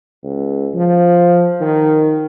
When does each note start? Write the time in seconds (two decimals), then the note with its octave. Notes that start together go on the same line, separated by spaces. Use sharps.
0.23 C#2
0.75 F3
1.61 D#3